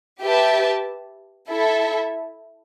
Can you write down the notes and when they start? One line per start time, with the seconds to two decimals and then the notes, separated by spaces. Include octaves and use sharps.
0.21 G4 B4 E5 A5
1.49 E4 A4 E5